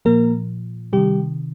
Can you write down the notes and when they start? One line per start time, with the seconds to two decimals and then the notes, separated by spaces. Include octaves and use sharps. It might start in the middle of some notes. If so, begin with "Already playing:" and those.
0.05 A#2 F3 A#3 A#4
0.93 C3 D#3 G3 G4